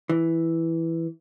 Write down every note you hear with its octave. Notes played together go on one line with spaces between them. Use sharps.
E3